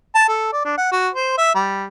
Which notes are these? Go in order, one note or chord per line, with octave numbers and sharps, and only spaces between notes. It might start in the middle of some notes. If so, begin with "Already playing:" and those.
A5
A4
D5
D4
F#5
F#4
C5
E5
G3